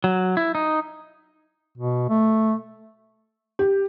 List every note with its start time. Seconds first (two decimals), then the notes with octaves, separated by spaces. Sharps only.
0.04 F#3
0.37 E4
0.55 D#4
1.77 B2
2.09 A3
3.59 G4